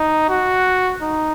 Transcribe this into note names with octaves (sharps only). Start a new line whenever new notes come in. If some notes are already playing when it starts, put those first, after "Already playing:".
Already playing: D#4
F#4
D#4